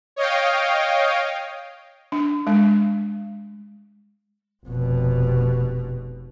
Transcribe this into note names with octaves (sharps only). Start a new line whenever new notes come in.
C#5 D#5 F5 G5
D4
G#3
F1 B2